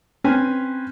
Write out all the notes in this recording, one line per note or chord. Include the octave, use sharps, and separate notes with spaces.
C4 C#4 B4 G#5 F6